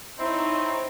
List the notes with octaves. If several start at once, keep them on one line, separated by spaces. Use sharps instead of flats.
C4 D#4 E4 C5 C#5